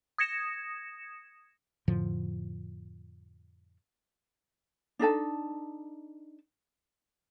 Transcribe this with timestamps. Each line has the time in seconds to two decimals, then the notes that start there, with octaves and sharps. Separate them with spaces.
0.18 D#6 G#6 A#6 C#7 E7
1.88 F2 A2 D3 F3
4.99 D4 D#4 A4 A5